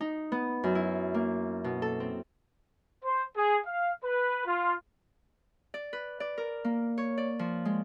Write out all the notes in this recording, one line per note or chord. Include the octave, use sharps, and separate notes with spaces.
D#4
B3
F#2
E4
A#3
B2
A4
C4
C5
G#4
F5
B4
F4
D5
B4
D5
A#4
A#3
C#5
D5
F3
G#3